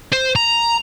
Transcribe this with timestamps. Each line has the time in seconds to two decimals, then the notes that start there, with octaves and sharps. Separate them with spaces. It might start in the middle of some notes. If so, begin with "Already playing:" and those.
0.12 C5
0.36 A#5